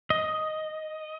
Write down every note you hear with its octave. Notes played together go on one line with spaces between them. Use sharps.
D#5